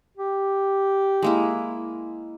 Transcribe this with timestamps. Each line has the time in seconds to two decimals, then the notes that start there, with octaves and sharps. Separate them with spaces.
0.17 G4
1.22 G#3 A#3 E4